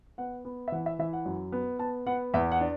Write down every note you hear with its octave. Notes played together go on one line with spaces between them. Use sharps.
B3 F#5
B3
E5
E3 F#5
E5
E3 E5
F#5
F#2
B3
B3 A5
B3 F#5
E2 E5
F#5
D4